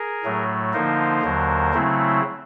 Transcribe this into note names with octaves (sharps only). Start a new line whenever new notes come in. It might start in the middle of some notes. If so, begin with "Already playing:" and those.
Already playing: G#4 A#4
A2 F#3 A3
D3 F3 A#3 D#4 A#4 C5
D#2 D3 F#3
C#3 F#3 A3 C4 E4